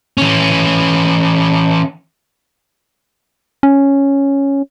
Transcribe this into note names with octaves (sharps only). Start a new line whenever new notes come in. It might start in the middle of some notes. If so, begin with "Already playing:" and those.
E3 C#4
C#4